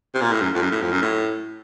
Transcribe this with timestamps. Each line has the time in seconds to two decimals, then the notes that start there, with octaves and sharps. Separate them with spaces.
0.14 C3
0.22 A#2
0.32 A2
0.42 F#2
0.55 F2
0.62 F#2
0.71 A2
0.82 F2
0.92 F#2
1.02 A2